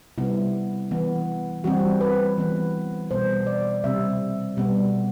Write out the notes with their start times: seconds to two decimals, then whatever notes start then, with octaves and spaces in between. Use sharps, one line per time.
0.18 C3 G3 B3 E4
0.91 E3 B3
1.64 E3 G3 C4 F#4
2.01 B4
2.38 E3 B3
3.11 B2 G3 B3 C5
3.47 D5
3.84 C3 G3 C4 E5
4.57 B2 G3 B3